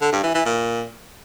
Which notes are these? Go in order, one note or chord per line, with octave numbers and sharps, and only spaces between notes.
D3
G2
E3
E3
A#2